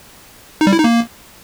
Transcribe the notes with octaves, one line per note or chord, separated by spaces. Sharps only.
D#4
G3
E4
D#4
A#3